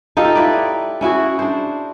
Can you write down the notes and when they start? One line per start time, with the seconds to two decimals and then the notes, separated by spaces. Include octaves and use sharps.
0.17 D#4 F4 G4 A4
0.36 E4 B4 D5
1.01 C#4 E4 F#4 G#4
1.39 D4 C5